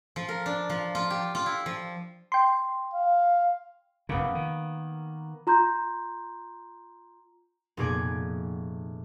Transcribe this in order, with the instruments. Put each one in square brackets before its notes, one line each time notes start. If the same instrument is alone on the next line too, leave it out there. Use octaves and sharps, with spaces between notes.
[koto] F3
A#4
D4
F3
F4
G4
F4
E4
F3
[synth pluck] G5 C6
[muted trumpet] F5
[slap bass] F1 F#2 C#3 [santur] A#3 B3
[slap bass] D#3
[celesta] F4 A#5 C6 G6
[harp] F1 A#2 B3 G#4 D6 G#6